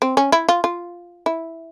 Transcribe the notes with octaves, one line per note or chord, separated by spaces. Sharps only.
C4
C#4
E4
F4
F4
E4